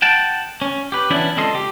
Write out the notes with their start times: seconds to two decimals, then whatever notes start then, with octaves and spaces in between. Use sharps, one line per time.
0.02 F#5 G5 A5
0.62 C#4
0.92 G4 B4
1.10 E3 B3 C#4 D4 E4
1.37 C#2 C4 A4 D#5 C6
1.55 G4